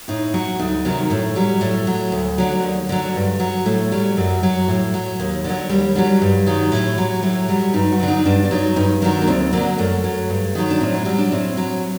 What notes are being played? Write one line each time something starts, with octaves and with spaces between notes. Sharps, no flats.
A2 D#4
F#3 F#4
D2 D#4
C3 D#3 F#3
A2 A3
F#3 G3
A2 A3
F#3
D2
D3 F#3
D#2
D3 F#3
G2
F#3
A2 A3
F#3 G3
F#2 F#3
F#3
A2
F#3
D#2
D3 F#3
D#2 G3
D3 F#3 G3
G2
D#3 F#3
A2
F#3
A2 F#3
F#3 G3
G2 D#4
F#4
D3 F#3
D#4
G2 D4
D4
F#3 D#4
G2 D#4
D#3 F#3 D4
A#3
D2 C4
D3 F#3 A#3
F#2 A3
F#3
G2
D#3 F#3
D4
A2 C4
F#3
F#3 G3
D4
A2 C4
F#3